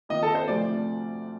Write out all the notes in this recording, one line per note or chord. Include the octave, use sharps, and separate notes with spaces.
F2 D#3 A#3 F4 D#5
A4
C5
D2 C3 F3 A3 D5